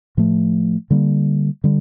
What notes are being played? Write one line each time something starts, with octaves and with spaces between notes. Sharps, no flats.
A2 F3 A3
D3 G3 A#3
D3 G3